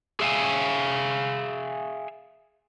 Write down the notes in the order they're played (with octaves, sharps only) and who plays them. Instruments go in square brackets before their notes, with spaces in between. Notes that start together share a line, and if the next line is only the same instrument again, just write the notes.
[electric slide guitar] G#4 E5 F5 G#5